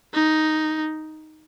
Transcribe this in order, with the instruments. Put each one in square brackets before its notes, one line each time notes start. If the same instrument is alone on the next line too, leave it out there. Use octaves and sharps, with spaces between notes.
[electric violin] D#4